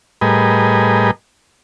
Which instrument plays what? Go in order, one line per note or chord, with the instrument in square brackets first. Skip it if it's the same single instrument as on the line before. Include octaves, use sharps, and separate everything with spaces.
[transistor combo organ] A2 G3 G#4 A#4 B4 D#5